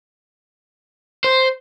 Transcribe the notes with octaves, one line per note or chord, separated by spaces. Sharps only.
C5